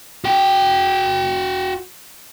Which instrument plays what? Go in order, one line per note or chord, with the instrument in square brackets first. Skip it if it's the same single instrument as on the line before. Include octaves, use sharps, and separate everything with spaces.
[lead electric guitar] F#4 G5